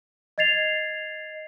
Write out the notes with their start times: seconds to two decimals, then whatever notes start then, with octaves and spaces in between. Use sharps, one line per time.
0.38 D#5 G#6 A6 C7 F7